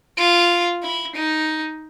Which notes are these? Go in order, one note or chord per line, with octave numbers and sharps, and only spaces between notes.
F4
E4
D#4